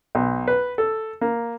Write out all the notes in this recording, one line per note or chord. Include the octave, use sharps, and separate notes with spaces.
B1
B4
A4
A#3